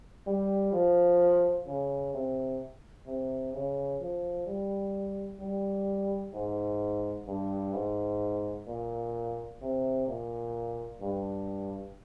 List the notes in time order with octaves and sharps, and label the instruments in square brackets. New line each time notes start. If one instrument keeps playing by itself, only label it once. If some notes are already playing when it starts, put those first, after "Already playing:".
[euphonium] G3
F3
C#3
C3
C3
C#3
F3
G3
G3
G#2
G2
G#2
A#2
C3
A#2
G2